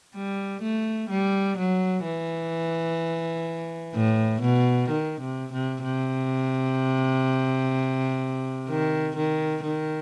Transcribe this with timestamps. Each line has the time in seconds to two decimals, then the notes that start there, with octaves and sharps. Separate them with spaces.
0.15 G3
0.62 A3
1.09 G3
1.58 F#3
2.05 E3
3.95 A2
4.41 B2
4.89 D#3
5.21 C3
5.53 C3
5.84 C3
8.69 D#3
9.16 D#3
9.63 D#3